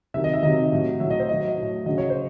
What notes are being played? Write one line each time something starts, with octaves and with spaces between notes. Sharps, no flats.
C3 D#3 F#3 E5
D#5
E5
C3 D#3 F#3 D#5
A2 F#3
A2 F#3 E5
D#5
C5
A2 F#3 D#5
A2 F#3
C#3 F#3 D#5
C#5
C5